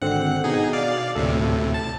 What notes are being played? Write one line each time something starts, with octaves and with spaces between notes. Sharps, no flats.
G#1 D3 C4 F#5
B2 D#4 G#4
D5 F5
D2 A2 C3 A4
A5 A6